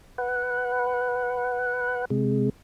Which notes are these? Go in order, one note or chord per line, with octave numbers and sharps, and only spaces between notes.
B4 F#5
C3 G#3